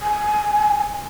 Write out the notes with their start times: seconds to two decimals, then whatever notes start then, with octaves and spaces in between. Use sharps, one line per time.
0.01 G#5